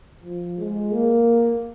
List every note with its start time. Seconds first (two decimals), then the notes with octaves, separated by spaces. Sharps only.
0.24 F3
0.58 G#3
0.92 A#3